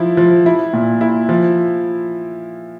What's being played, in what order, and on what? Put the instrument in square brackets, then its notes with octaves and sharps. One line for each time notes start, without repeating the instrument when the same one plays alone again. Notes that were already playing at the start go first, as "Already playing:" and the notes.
Already playing: [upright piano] F3 E4
F3
E4
A#2
E4
F3